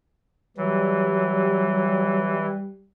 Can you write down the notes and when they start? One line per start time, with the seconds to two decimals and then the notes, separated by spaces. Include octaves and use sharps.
0.57 E3 F#3 G3